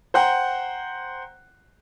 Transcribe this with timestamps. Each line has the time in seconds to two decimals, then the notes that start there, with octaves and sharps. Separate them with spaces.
0.14 C5 F#5 G5 A#5